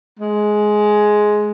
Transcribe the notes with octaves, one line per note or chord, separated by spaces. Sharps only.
G#3